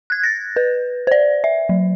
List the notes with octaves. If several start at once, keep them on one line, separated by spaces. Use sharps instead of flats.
F#6 G#6
A6 A#6
B4
C5 D5
E5
F#3